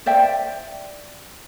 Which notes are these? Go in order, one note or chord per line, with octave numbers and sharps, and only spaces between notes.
C5 D5 E5 G5